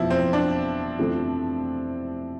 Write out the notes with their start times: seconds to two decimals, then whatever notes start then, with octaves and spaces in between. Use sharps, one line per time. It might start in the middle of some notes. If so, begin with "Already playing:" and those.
Already playing: F1 E2 B2 F3 B3 E4
0.10 C4
0.33 D4
0.99 F2 C3 E3 A3 E4